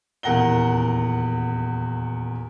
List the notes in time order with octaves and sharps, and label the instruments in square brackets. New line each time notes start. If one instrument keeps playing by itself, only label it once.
[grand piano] D#1 E2 A#4 F#5 A#6 G7